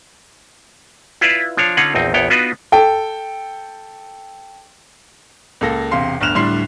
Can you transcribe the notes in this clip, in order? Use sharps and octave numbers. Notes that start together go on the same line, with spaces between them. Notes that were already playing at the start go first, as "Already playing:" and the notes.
E4 F4 B4 D5 E5 F5
F3 D4 C#5 F5
D3 C#4 D#4 F4 F5 F#5
A#1 E2 C4 D#4
A#1 E2 B3 C#5 G5
B3 D4 D#4 F4 F#4 B4
A4 G5
C#2 A#3 A4 A#6
E1 C3 F5 C6 C7
G1 D2 F6 F#6 E7 F7
D1 A2 G3 D4 C6 C7